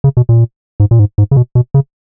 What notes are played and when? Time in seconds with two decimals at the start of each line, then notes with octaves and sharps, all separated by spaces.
0.04 C#3
0.17 B2
0.29 A#2
0.80 G#2
0.91 A#2
0.99 G#2
1.18 G#2
1.31 C#3
1.36 B2
1.55 B2
1.74 C#3